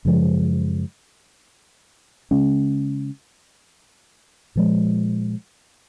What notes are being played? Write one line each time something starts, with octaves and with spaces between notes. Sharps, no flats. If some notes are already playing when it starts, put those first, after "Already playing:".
F#2 C#3 F3 G#3
C#3 G#3 C#4
A#2 F3 G#3